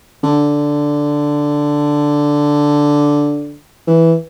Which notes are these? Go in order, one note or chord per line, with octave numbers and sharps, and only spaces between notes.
D3
E3